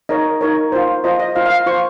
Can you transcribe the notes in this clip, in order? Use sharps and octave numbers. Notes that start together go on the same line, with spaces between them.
D#4 A#4 C#5 D#5
D#4 A#4 C#5
F4 C5
F4 C5 D#5
D#5
F4 C5 F5
F5
F4 C5 C#6